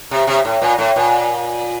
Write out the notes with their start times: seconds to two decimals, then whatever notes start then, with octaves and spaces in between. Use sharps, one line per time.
0.11 C3
0.27 C3
0.45 A2
0.62 A#2
0.78 A2
0.96 A#2